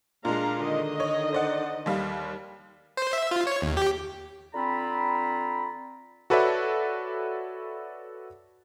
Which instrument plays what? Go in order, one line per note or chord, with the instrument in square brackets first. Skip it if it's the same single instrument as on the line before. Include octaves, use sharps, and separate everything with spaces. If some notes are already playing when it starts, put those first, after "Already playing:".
[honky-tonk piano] A#2 G#3 [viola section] D4 F5 A#5
[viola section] D3 D#3 D#5
[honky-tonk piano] C#5
C5 D5 F#5
D#2 G3 F5
[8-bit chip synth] C5
E5
F4
C#5
D#2
G4
[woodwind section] D3 C4 F4 A#5 B5
[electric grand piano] F#4 A4 B4 C#5 D5 E5